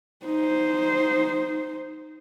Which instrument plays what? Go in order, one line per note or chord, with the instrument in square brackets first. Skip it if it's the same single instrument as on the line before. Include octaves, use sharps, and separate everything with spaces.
[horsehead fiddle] D#4 C5